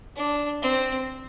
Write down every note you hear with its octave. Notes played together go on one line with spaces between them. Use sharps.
D4
C4